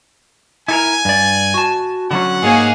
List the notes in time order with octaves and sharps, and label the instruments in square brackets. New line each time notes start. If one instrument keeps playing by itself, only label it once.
[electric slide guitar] E4 A4 A#4 [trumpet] G#5
[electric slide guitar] G2 D5
F#4 A5
[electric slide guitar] D3 F#3 C#4 [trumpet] F#5
[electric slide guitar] G#2 C#5 [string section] A#3 G#4 F5